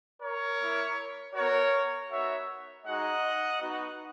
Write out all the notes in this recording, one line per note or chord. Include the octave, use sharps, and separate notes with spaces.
A#4 C#5
A#3 E4
B3 F#4 A#4 C#5
B3 D#4 F#4 C#5 E5
G#3 D#4 F#4 D#5 F#5
B3 D#4 F#4